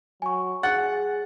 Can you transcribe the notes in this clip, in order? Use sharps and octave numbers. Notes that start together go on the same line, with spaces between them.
F#3 G#5 C#6
G#4 F#5 A6